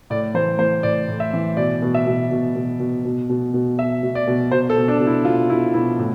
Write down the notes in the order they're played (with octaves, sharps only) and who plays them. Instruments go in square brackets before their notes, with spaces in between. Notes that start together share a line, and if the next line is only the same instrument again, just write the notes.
[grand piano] A2 D5
E3 C5
E3 C5
A2 D5
A2
E5
E3
B2 D5
B2
E5
B2
B2
B2
B2
B2
B2
B2
B2 E5
B2
D5
B2
B2 C5
A4
B2
D4
B2
E4
B2 F4
B2 E4
B2 E4
A2